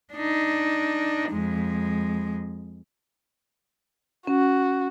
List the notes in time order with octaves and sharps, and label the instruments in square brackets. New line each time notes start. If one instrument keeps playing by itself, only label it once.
[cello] D4 D#4
F2 G#3
[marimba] C#4 [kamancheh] F#4